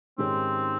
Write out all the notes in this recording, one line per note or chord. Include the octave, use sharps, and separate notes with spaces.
G#2 D#3 G#3 C4 C#4 G4